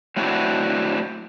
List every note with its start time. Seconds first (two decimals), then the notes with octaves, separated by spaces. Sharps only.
0.16 F#3 A3 C4 D4 E4 F#4